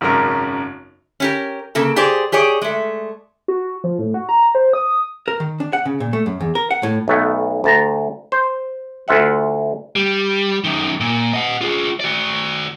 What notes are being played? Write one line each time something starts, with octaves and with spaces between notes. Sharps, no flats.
G#1 F#2 C#3 A#4
C#4 G4 A#4
C#3 A#3 A4
G4 G#4 C5 D5
G4 G#4 C#5 D5
G#3 A3
F#4
F3
A2
F#4
A#5
C5
D#6
A#4
D#3
D4
F#5
C#3
A#2
A3
F#2
E2
A#4
F#5
A2
B1 A3 B3
D2 A5 A#5
C5
D2 F4 E5 F#5
G3
F#2 D#3
A#2
D#5 F#5
F4 G#4
F#4 D5